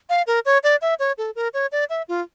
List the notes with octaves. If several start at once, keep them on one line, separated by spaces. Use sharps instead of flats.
F5
A#4
C#5
D5
E5
C#5
A4
A#4
C#5
D5
E5
F4